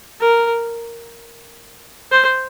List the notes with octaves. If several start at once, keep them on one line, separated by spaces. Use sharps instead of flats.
A#4
C5